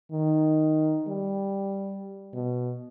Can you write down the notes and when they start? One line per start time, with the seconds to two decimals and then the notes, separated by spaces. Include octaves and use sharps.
0.12 D#3
1.08 G3
2.34 B2